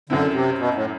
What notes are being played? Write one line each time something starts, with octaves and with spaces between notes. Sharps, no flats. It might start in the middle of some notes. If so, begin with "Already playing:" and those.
F#2 D3 F#3 C4 E4
C3
B2
A2